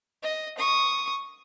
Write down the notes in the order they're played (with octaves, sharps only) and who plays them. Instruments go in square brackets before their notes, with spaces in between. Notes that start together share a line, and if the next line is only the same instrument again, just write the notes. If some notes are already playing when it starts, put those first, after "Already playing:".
[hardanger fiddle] D#5
C#6 D#6